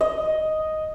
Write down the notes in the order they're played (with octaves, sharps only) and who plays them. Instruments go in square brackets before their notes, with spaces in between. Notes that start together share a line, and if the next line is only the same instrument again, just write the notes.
[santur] D#5